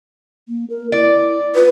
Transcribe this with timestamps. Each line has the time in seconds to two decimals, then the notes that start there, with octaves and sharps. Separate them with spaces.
0.48 A#3
0.70 A#4
0.92 E4 D5
1.55 F4 B4